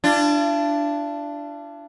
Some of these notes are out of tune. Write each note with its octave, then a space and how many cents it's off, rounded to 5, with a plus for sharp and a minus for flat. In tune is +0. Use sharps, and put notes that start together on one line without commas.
D4 +0 F4 -45